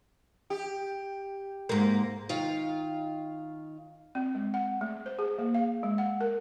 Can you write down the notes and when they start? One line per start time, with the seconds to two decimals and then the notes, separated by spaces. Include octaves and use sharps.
0.50 G4
1.69 G#2 A#3
2.29 D#3 F4 F5
4.15 C4
4.35 G#3
4.54 F#5
4.81 A3
5.06 C5
5.19 G#4
5.38 A#3
5.55 F5
5.83 G#3
5.98 F#5
6.21 A#4